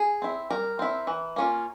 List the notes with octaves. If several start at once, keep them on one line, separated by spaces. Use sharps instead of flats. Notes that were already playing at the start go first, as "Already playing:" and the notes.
Already playing: G#4
C4 E4
G3 A#4
C4 E4
E3
A#3 C#4 F4